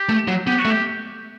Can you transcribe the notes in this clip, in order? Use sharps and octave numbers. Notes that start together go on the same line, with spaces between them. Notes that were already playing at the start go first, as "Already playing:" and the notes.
Already playing: G4
A3
F#3
B3 G4
F#4
A3
G4